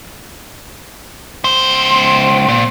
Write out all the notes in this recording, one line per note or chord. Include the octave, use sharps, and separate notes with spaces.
C#2 C5
A#2